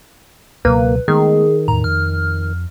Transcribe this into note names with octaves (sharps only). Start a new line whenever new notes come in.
C#2 B2 F#3 A#3 B4
D#3 G#3 A3 B3 G#4
E2 A2 A#5
F2 F6